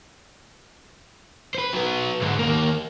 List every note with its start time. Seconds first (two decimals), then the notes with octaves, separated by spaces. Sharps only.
1.55 B4 C5
1.73 F#3 B3
2.22 G#2 D3
2.39 D#2 A#3